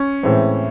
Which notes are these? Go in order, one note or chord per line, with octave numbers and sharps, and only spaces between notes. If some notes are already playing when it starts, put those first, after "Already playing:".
Already playing: C#4
A2 E3 G#3 C4